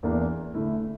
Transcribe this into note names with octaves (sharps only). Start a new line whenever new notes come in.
E2 E3 A#3 D4
D3 A3 E4